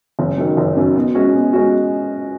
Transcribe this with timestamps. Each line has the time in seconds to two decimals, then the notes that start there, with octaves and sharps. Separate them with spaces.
0.19 F#1
0.38 F#2 D#3
0.57 F#1
0.76 F#2 D#3
0.95 B2
1.15 G#3 C#4 F#4
1.34 B2
1.53 G#3 C#4 F#4